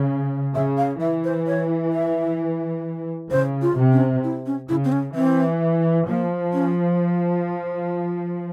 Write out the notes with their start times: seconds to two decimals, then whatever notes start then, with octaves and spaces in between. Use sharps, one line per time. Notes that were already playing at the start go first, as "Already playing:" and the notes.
Already playing: C#3
0.55 C#3 E5
0.77 F5
1.00 E3 E5
1.24 C5
1.47 C#5
1.93 E5
3.31 C#3 C5
3.62 F4
3.77 C3
3.92 C#4
4.24 E4
4.46 C#4
4.69 C#3 E4
4.84 C4
4.92 C#4
5.15 E3 C4
6.08 F3 A#3
6.53 C#4